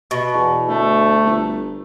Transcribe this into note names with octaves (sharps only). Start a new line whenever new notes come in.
B2
E2
D2 A3
G1